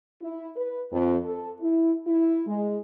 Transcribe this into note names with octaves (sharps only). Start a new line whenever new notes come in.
E4
B4
F2
A4
E4
E4
G#3